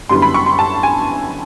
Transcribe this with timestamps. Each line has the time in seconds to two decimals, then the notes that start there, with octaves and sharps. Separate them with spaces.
0.09 F#2 D3 G3 B3 E4 C6
0.22 B5
0.34 C#6
0.46 C6
0.59 A5
0.83 G#5